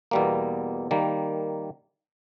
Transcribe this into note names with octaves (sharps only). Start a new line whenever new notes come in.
E2 B2 G3 A#3
D#3 G3 A#3